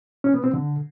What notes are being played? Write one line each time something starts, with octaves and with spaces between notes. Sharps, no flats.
C#4
B3
C4
D3